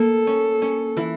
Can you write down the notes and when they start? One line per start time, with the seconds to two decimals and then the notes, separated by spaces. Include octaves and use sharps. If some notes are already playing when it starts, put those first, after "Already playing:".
Already playing: A#3 A4
0.27 C#4
0.62 C#4
0.97 E3 E4